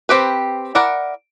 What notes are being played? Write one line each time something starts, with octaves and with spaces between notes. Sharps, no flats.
C4 G4 B4
E4 A#4 D5 F#5